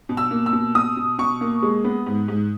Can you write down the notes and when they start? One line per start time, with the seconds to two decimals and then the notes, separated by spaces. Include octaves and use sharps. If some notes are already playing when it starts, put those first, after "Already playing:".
0.09 B2
0.17 E6
0.31 A#3
0.46 E6
0.53 B2
0.75 B2 D#6
0.97 B2
1.18 B2 C#6
1.41 A#3
1.62 G#3
1.84 B3
2.06 G#2
2.28 G#2